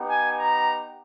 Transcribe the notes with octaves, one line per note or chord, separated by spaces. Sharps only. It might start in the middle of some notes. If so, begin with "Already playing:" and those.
Already playing: B3 D#4 G4
G#5
A#5